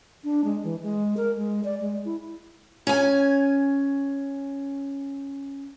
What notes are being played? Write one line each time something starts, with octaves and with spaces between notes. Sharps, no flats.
D4
G#3
E3
G#3
A#4
G#3
D5
G#3
E4
C#4 G#5